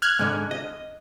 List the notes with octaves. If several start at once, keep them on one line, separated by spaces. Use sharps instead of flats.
F6 F#6 G#6
G#2 D3
D#5